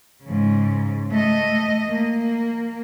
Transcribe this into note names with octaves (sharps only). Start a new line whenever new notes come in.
G#2 C#3
A3 D#5
A#3